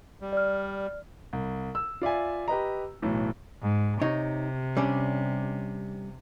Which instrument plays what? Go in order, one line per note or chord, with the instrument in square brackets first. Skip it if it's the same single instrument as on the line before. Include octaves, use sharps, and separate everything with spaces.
[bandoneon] G3
[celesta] D5 F6
[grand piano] C2
E6
F4 D5 E5 G#5
G4 B4 D#5 A#5
B1 A2 E3
[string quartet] G#2
[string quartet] C3 [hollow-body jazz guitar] D#4 C#5
[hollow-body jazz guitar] G3 C#4 D4